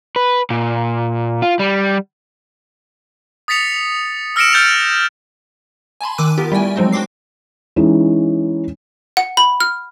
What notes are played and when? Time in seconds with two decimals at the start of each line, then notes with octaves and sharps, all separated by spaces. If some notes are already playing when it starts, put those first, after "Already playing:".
0.16 B4
0.50 A#2
1.42 F4
1.59 G3
3.48 D#6 A6 B6 C#7 F7
4.36 E6 F6 A#6 C#7 D7 E7
4.53 F6 G6 A6 D7 F7
6.01 G#5 A5 B5 C6
6.18 D#3 D6 E6 F#6 D#7
6.38 B3 F4 G4 A#4
6.52 G3 A3 E4 G5 G#5
6.76 F3 F#3 G#3 C4 D#4 F#4
6.92 D4 F#4 G5 C6 D6 C7
7.76 E3 G#3 C#4 D#4
9.17 F#5
9.37 B5
9.60 F6